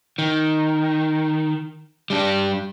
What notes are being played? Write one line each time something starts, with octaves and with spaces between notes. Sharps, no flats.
D#3
G3 D4